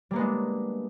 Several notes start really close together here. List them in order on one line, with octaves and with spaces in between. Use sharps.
G3 A#3 B3 G#3 D4